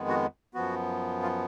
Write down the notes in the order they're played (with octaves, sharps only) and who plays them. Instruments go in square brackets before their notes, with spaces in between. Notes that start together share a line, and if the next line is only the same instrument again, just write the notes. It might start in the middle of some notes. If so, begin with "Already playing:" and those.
Already playing: [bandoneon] F2 D#3 G#3 B3
F#4
F#2 F3 B3 F#4
F4